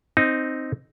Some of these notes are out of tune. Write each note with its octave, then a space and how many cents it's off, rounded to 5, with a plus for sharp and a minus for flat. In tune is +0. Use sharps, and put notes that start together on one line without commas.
C4 +0 D#4 +0